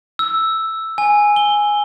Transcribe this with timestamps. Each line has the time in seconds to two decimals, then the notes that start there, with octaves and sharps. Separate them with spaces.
0.19 E6
0.98 G#5
1.36 G7